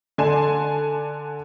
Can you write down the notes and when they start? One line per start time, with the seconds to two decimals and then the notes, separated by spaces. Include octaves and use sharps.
0.18 D3 D5 G#5 A5 C6 E7